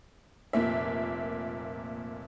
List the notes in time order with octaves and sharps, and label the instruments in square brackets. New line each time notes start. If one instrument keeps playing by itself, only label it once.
[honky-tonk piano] F1 A#2 A#3 E5